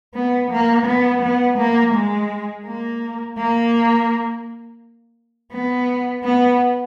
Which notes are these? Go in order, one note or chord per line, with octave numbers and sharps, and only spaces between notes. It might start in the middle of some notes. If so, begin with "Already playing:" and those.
B3
A#3
B3
B3
A#3
G#3
A#3
A#3
B3
B3